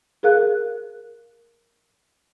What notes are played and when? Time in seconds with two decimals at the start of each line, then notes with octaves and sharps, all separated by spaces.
0.23 G#4 A#4 F5 F#6